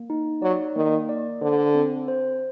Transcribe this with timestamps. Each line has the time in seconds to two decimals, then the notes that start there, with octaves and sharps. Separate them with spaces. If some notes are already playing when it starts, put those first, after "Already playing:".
Already playing: A#3
0.10 D#4
0.42 F#3 D5
0.76 D#3 A#3
1.09 D5
1.42 D3 C5
1.75 C4
2.08 C5